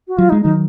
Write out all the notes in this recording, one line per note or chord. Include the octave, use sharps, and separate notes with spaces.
F#4
F#3 F4
G#3 D#4
D#3 F#3 D#4